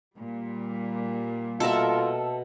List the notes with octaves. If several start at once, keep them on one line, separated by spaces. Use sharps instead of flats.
A#2 G3
B2 F4 A4 A#4 E5